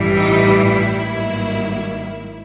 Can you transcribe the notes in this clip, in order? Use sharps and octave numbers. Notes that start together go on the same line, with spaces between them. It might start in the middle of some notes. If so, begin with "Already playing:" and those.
Already playing: A1 G2 E3 G3
D#4
E4
G#1 G2 D#3 F#3 A#3